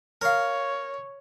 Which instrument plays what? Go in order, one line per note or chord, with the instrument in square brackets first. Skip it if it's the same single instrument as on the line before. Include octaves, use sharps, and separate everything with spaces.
[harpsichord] A#4 F5 [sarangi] C#5